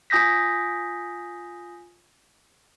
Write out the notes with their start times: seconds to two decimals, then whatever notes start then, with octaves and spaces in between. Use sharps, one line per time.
0.10 F4 G#5 D#6 G6 A#6 B6